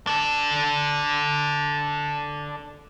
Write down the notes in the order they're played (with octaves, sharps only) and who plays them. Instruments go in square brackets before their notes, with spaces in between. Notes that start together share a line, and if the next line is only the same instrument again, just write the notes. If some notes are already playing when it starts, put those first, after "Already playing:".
[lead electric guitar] D4 A4